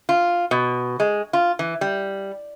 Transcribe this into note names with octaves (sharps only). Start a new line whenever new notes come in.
F4
B2
G#3
F4
E3
G3